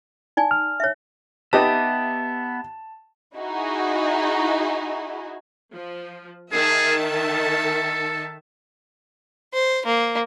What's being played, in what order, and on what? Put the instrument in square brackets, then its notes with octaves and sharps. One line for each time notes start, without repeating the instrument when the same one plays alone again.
[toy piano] D#4 D5 G#5
[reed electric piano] F6
[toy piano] C#5 E5
[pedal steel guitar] B3 E5 [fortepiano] D#4 G4 B4 [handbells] A5
[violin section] D#4 E4 F#4 G#4
[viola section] F3
[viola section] D#3 E5 A5 [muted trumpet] G#4
[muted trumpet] A4
[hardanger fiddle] C5
A#3